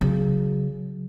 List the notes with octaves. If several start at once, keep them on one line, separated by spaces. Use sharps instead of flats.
C#3 F#3